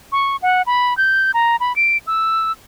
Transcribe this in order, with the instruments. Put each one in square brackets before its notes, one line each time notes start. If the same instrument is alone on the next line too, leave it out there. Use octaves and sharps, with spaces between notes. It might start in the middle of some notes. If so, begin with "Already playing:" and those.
[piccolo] C#6
F#5
B5
G6
A#5
B5
D7
E6